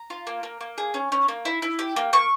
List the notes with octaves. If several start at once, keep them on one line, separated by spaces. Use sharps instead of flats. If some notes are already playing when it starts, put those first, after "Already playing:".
Already playing: A#5
F4
A#3
A#3
A#3
G#4
C#4
C#4
A#3
E4
E4
G4
A#3
A#3 C#6